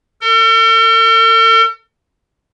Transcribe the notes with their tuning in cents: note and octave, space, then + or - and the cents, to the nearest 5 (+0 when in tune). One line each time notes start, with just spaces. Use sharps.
A4 +45